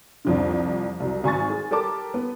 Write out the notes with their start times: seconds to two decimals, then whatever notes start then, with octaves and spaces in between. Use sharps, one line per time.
0.25 C2 F2 D3
1.00 C2 F#3
1.24 G#1 G#5 C#6 A6
1.50 G#4
1.71 G4 A4 A#4 A5 D6
2.14 B3